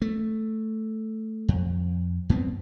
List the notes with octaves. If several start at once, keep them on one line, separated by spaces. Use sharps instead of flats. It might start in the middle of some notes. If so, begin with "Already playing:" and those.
A3
F2
F#2 B3 C4